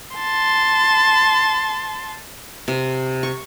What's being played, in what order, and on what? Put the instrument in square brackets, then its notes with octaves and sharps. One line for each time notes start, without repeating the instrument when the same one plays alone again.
[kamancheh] A5 C6
[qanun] C3
C#6